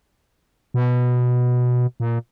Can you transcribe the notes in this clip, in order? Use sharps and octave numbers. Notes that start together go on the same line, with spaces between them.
B2
A#2